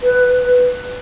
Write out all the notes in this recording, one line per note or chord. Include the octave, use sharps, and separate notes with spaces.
B4